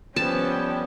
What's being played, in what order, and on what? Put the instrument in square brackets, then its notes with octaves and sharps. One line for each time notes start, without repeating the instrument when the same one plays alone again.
[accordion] F3 G3 B3 [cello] C#4 [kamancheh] B4 G5 [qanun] A5